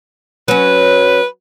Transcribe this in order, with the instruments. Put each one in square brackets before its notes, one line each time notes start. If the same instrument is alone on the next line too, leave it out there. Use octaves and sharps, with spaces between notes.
[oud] F#3 C#4 [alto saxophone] B4